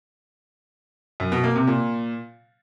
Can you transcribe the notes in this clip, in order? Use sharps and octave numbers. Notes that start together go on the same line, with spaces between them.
F#2
B2
A#3
C3
A#2